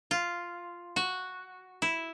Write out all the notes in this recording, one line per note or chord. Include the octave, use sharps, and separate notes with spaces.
F4
F#4
E4